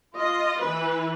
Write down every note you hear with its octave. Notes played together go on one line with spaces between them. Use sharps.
F4 D#5
E3 B4